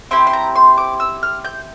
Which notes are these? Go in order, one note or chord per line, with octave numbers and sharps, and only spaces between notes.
C4 E4 G4 C6
C6
A#5
C6
D6
E6
F6
G6